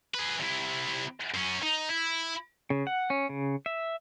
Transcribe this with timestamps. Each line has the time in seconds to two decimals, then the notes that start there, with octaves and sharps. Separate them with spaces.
0.14 G#4 B4
0.40 C3 E4
1.34 F#2 C#4
1.63 D#4
1.89 E4
2.70 C#3
2.87 F#5
3.10 C#4
3.29 C#3
3.66 E5